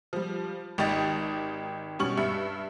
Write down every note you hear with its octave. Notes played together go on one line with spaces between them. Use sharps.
F3 G3
G#1 D#3 G4 D#5 D#6 A6
B2 G3 C#4 C#6 F#7
G2 E5 C#7